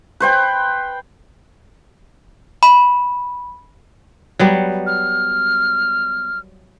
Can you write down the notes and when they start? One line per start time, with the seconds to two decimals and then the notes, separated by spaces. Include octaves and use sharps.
0.20 B4 C5 G5
2.63 B5
4.39 F#3 G3 B3
4.87 F6